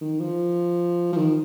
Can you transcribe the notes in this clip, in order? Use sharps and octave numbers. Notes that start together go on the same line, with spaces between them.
D#3
F3
F3
D#3